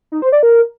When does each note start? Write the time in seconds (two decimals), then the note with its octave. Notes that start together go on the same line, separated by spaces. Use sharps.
0.12 D#4
0.22 C5
0.32 D5
0.43 A#4